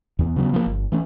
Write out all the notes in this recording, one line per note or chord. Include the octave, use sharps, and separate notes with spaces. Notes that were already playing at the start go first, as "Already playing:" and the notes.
E2 B3
C#3 F#3 B3
F3 A#3
G1
E3 A3 C#4